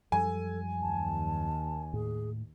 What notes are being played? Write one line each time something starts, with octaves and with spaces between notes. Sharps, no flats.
F#2 F3 G3 A4 G#5
D#2 A5
A2 G#4